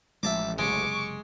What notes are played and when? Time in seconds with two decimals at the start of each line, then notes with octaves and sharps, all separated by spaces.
0.23 A1 F3 G3 G#3 E5 A5 D6
0.58 F#1 C3 G#3 C#6 D6